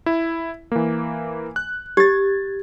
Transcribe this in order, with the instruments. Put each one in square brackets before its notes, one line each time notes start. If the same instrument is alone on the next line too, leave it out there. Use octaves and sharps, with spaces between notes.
[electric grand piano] E4
E3 A#3
F#6
[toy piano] G4 [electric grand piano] G#6 A6